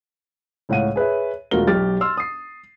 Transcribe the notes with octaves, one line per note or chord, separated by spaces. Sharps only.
C#2 A2 C#5 F5 F#5 D#7
G#4 B4 C#5 E5
E1 A3 F4 F#4 A#4 G7
B1 G4 F6 A6
C6 E6 F6
D#6 C7